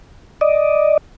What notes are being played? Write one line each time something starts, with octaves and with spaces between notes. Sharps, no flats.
D5 D#5